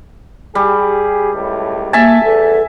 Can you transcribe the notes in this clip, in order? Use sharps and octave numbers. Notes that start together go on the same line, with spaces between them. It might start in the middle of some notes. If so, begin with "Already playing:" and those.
G3 G4 G#4
C#2 A2
A#3 E5 G#5 A5
E2 A4